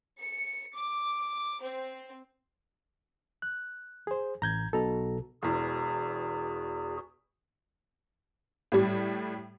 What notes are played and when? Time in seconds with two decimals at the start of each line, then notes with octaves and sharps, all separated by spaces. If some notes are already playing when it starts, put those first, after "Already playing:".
0.20 C#7
0.75 D6
1.61 C4
3.42 F#6
4.07 G#4 C5
4.42 A1 A#5 G6 G#6
4.73 B1 B2 A4 A#5
5.43 E1 E2 F#4 G#4
8.72 A2 G3